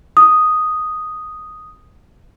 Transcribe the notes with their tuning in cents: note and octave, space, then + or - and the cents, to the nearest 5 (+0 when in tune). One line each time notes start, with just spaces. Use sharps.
D#6 +0